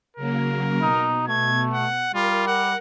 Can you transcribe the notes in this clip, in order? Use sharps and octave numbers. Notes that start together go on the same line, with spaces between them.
C#3 F#3 A#3 A#4
B2 D#4
A3 G#6
F#5
G3 F4 A#4
F#5